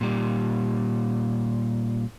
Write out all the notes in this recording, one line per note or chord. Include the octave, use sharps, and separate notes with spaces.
A#2 G3